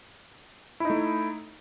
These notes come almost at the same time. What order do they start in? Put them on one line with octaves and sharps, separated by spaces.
E4 D#4 A3